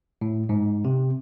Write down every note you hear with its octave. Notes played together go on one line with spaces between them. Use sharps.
A2
G#2
C3